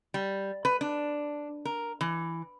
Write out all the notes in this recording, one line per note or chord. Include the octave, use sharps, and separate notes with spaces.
G3
B4
D4
A#4
E3